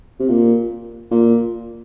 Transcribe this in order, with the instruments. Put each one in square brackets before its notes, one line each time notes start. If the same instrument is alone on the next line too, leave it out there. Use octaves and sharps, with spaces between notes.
[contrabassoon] C3
A#2
A#2